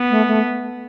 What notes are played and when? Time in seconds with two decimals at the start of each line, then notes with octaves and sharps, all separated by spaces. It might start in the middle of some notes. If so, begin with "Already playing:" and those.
Already playing: B3
0.10 A3
0.27 A3